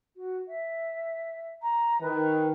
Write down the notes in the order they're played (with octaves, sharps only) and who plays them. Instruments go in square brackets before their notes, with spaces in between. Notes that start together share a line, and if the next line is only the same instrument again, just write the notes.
[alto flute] F#4
E5
A#5
[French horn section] D#3 [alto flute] B4